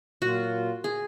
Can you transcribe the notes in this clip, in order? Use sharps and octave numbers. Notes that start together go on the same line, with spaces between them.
A#2 F#3 A#3 F4 F#4
G#4